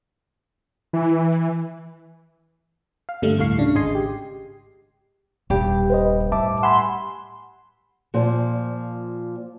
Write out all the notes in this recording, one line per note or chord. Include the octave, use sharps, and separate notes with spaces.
E3
F5
G2 D3 G3 A3
D2 A2 A3 F5 C#6 C7
C#3 D4
G#1 G#4 D#5 G#5 C6 C7
G4
D#1 G2 G4
B4 C5 D#5
A2 E5 A5 D6
F#5 G#5 B5 C6 E6
A#2 F3